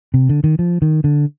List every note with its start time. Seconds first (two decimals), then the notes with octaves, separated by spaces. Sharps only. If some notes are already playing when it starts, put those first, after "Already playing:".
0.14 C3
0.29 D3
0.44 D#3
0.59 F3
0.82 D#3
1.04 D3